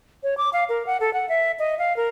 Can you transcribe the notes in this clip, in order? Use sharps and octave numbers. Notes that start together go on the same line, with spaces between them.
C#5
D6
F5
A#4
F#5
A4
F#5
E5
D#5
F5
A#4